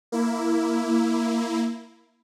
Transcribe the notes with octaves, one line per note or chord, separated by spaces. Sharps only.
A#3 E4